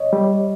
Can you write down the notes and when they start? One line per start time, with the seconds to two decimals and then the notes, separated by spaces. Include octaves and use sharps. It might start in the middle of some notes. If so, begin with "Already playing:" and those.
Already playing: C#5 D#5
0.13 G3